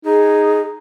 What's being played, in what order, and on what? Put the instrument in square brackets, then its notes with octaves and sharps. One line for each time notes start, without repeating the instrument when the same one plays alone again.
[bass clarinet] D#4 [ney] G#4